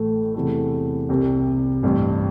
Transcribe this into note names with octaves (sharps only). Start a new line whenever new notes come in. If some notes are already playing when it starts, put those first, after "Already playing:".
Already playing: A1 A2 A3
E2 C3 E3 A3
C2 C3 G3
A1 G2 G3 C4